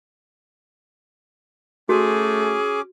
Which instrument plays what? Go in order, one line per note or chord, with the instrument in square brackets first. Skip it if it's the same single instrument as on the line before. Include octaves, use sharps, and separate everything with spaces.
[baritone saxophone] A3 [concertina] C#4 D6 [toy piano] F#4 [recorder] G#4